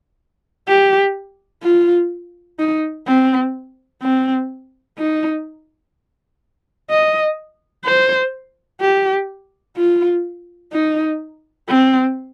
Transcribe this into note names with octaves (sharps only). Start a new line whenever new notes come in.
G4
F4
D#4
C4
C4
D#4
D#5
C5
G4
F4
D#4
C4